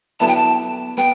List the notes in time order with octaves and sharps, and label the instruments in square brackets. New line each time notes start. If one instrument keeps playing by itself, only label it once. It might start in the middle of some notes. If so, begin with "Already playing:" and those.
[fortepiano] D3 F#3 B3 E4 [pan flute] A5
[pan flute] G5
A5
[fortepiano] B3 [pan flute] G5